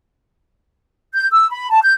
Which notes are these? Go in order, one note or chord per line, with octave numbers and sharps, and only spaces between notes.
G6
E6
B5
A5
G6